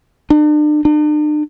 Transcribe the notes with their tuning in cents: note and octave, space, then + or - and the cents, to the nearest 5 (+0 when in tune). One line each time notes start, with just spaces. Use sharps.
D4 +40
D4 +45